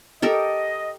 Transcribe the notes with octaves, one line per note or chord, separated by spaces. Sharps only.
G4 A4 A#4 D#5